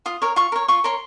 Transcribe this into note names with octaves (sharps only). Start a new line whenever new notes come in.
F4 D#6
A#4 C#5
F4 C#6
A#4 C#5
F4 C#6
A#4 C#5 C6